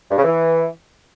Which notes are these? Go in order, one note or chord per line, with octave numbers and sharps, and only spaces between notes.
G2
C#3
E3